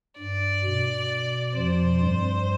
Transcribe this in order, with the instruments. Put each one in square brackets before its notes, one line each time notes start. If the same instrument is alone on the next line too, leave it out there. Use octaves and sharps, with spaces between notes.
[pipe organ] G2 [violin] D5
[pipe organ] B2
[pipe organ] F2 F3 [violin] C5
[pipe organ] G2 G3